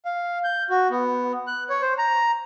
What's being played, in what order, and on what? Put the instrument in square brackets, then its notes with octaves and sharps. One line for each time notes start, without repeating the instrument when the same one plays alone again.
[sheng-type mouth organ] F5
G6
F#4
B3
F#6
C#5
C5
A#5